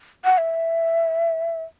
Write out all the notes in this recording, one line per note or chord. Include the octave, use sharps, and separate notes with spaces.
F#5
E5